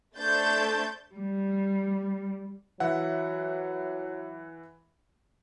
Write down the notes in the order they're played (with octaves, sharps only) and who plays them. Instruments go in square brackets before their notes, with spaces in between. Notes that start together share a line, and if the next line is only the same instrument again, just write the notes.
[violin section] A3 D4 C5 G6 A6
[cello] G3
[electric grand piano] E3 E5 F#5 [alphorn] F#3